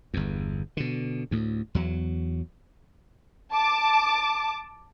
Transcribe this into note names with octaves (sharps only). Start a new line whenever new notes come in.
G1 E2
B2 D3
D2 A2
E2 F#3
A5 D6